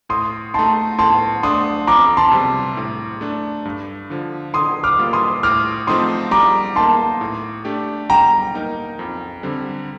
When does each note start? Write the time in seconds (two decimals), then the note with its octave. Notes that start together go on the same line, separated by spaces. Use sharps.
0.09 A2 C6 D#6
0.54 A3 D#4 A5 C6
0.98 A2 A5 C6
1.43 A3 D4 C6 D#6
1.87 F2 A#5 D6
2.17 A5 C6
2.31 C3 G3
2.77 A2
3.21 A3 D4
3.65 G2
4.10 D3 F3
4.54 D3 C6 D#6
4.83 D6 F6
4.99 G3 A#3 F4
5.13 C6 D#6
5.43 A2 D6 F6
5.87 F3 A3 C4 D#4 C6 D#6
6.31 G3 A#5 D6
6.76 A#3 D#4 A5 C6
7.21 A2
7.65 A3 D4 G4
8.10 G3 G5 A#5
8.54 A#3 D#4 A#4
8.99 F2
9.43 D3 G3 C4